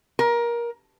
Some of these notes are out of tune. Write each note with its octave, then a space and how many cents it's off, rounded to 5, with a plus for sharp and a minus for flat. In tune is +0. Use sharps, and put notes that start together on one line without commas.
A#4 +20